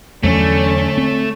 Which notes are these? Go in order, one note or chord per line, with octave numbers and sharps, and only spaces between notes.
E2 D3 F#3 A3 C#4 D5
C4